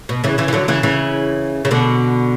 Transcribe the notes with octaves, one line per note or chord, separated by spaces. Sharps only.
B2
C#3 E3
C#3 E3
E3
D3 F#3
C#3 E3
C#3 E3
C#3
B2 D3